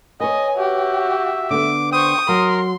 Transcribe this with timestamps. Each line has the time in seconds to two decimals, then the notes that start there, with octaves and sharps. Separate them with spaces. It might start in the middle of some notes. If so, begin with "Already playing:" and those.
0.20 B4 C#5 D#5 G#5
0.57 F#4 G4 E5
1.50 D3 B3 D6
1.93 C5 G5 C#6 D#6
2.28 F#3 A#4 C6